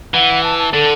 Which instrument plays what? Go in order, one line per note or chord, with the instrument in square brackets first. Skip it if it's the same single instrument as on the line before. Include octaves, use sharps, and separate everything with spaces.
[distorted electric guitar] E3 [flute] F#5
[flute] A5
A5
[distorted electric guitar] D3 [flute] A4